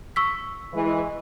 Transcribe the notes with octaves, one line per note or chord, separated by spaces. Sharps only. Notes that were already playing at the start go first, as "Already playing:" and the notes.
C#6 E6 B6
E3 G#3